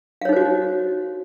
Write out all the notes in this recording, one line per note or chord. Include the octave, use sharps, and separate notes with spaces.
D#4 F#4 C5 C#5 F5